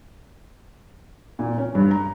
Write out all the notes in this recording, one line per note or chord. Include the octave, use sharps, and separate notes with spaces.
A#2
C#4
G2
A#5